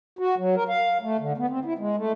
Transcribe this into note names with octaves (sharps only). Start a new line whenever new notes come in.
F#4
F#3
A#4
F5
A3
D3
B3
C4
E4
G#3
A3